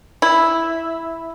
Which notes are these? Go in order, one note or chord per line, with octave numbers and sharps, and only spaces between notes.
E4